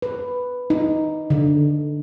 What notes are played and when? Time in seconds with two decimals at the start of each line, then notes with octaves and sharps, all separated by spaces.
0.02 B4
0.70 D#4
1.30 D3